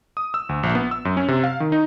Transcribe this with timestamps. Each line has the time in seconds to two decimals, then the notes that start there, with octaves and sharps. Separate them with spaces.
0.17 D#6
0.34 E6
0.49 D2
0.63 A#1
0.75 B3
0.91 E6
1.05 F#2
1.17 C#4
1.28 C3
1.44 F5
1.60 D#3
1.72 D#4